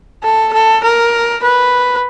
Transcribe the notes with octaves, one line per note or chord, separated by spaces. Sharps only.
A4
A4
A#4
B4